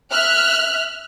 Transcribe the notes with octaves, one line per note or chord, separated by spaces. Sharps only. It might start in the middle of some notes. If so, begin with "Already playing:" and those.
E5 F6 F#6